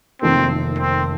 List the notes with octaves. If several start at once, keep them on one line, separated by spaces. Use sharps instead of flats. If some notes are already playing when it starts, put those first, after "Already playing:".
F1 F2 D#3 A#3 C4
C4